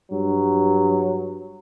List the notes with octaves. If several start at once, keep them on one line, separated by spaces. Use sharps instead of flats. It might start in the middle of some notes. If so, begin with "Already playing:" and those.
G2 F#3